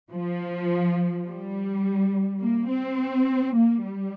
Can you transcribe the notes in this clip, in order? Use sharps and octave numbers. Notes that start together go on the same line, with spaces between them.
F3
G3
A#3
C4
A#3
G3